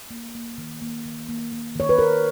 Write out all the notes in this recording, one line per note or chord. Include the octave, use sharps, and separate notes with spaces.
A#3
A#3
D#3
A#3
D#3
A#3
A#3
D#3 C#5
B4
D#3 A#4